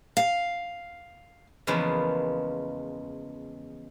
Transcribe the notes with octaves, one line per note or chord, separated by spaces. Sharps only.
F5
E2 C#3 F3 G#3 A#3 B4